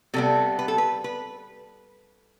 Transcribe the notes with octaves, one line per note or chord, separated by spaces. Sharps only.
C3 G3 B3 A4
B4
A4
B4
B4